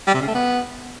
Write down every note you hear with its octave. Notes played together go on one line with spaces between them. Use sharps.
G3
C3
C#3
A3
B3